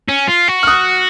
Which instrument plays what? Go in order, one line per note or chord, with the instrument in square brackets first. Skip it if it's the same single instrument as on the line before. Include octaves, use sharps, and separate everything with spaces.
[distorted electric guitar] C#4
F4
F#4
[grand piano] F6
D#6 F#6